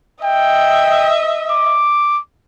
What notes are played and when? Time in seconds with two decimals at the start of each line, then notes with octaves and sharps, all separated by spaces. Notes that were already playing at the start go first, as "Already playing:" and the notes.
0.24 D#5 E5 G5
1.50 D6